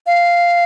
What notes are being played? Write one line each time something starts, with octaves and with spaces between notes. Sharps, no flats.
F5